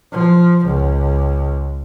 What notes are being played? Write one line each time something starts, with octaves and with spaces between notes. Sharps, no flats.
F3
C#2